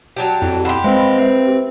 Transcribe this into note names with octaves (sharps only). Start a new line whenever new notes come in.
F#3 D4 G4
F2 E4
E4 G4 F#5 B5 C6
G#3 C4 B4 C5 F5
C4 B4 C5 E5